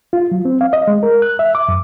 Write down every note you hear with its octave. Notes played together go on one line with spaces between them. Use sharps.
F4
F#3
C4
F5
D#5
G#3
A#4
F#6
E5
D6
F#2